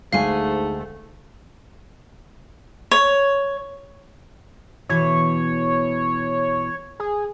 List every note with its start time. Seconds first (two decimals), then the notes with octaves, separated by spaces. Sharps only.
0.13 D2 G#2 G#3 A3 F5 G#5
2.91 C#5
4.89 B2 E3 C#5
7.00 G#4